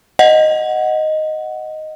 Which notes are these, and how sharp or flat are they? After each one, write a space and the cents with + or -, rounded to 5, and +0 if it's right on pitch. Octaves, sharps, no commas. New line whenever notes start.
D#5 +0 F#5 +0